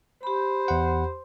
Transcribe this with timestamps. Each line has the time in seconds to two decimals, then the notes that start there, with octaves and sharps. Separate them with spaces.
0.23 G4 C5 B5
0.68 E2 F#5